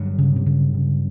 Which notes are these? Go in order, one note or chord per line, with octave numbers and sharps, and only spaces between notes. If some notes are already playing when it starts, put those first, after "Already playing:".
Already playing: G2 D3 F#3
C#3
C3
C#3
C#3